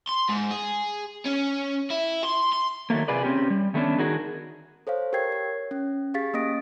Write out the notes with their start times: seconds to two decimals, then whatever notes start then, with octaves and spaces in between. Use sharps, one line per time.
0.08 C6
0.29 G#2
0.51 G#4
1.26 C#4
1.91 E4
2.24 C6
2.52 C6
2.90 D#3 F#3 A3 A#3
3.08 C3 F4 G#4 B4 D5
3.23 C4 C#4 G4
3.50 G3
3.74 D#3 A3 B3 C#4 D4
3.98 D#3 D#4 F#4 G#4 A#4
4.87 A4 C5 C#5 F5
5.13 G4 A#4 C#5 G5 G#6 C7
5.32 C#5
5.71 C#4
6.14 G4 G#4 F5 A6 B6
6.34 A#3 C#4 D#5 D#6 A#6 D7